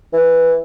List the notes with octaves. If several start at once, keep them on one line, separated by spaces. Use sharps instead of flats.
E3